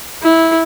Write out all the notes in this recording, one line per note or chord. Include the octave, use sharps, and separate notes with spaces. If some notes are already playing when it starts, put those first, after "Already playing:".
E4